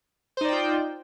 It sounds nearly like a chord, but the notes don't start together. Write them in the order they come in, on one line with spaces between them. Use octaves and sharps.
C5 D#4 D5 G5 F4